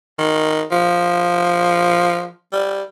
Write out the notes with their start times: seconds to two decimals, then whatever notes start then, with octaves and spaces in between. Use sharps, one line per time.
0.19 D#3
0.72 F3
2.52 G3